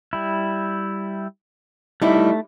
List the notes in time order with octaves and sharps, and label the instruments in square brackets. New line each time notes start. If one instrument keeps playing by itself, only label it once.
[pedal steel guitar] G3 E4
[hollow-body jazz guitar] G3 D#4 E4 [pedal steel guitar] A3